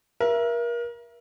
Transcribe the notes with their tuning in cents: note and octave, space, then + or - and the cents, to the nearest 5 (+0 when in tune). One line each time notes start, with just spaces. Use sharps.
A#4 +30 E5 +25